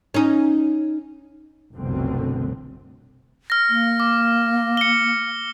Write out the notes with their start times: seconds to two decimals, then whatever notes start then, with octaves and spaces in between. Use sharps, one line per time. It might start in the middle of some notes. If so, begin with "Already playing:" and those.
0.14 C#4 D#4
1.75 F1 C2 F#2 B2 D3 C4
3.50 F6 A#6
3.69 A#3
4.00 D6
4.77 C#7 G7